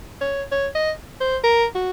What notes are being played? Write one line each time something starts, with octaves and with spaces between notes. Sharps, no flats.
C#5
C#5
D#5
C5
A#4
F#4